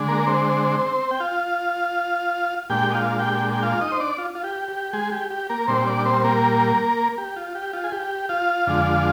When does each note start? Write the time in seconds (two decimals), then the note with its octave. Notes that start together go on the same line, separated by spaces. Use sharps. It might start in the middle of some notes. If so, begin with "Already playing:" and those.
Already playing: D3 G#3 D4
0.08 A#3 A#4
0.27 C4 C5
1.11 G5
1.20 F4 F5
2.70 A#2 G#3 D4 G4 G5
2.91 D#5
2.94 F4 F5
3.19 G4 G5
3.53 G5
3.63 F4 F5
3.81 D#4 D#5
3.92 C5
4.00 D4 D5
4.18 F4
4.35 F4
4.44 G4
4.68 G4
4.93 G#3 G#4
5.12 G4
5.30 G4
5.49 A#3 A#4
5.67 A#2 G3 C4 D4 C5
5.87 D4 D5
6.05 C4 C5
6.24 A#3 A#4
7.18 G4
7.36 F4
7.55 G4
7.73 F4
7.84 G#4
7.92 G4
8.29 F4 F5
8.67 F2 D3 G#3 D4